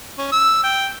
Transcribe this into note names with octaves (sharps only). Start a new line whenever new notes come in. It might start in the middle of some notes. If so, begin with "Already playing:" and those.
C#4
E6
G5